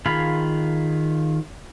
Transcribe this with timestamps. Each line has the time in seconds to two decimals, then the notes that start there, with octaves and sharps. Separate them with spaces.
0.06 D#3 F4 G#4 F5 B5